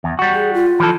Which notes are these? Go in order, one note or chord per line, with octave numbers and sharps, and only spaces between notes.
E2
G3 F#4
G#4
F4
E3 F3 A4